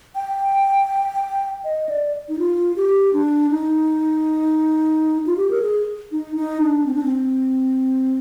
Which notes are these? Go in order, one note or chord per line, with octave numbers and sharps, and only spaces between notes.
G5
D#5
D5
D#4
F4
G4
D4
D#4
F4
G4
A#4
G#4
D#4
D#4
D4
C4
D4
C4